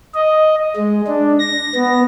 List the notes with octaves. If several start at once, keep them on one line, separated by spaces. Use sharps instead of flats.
D#5
G#3
D4
A#6
B3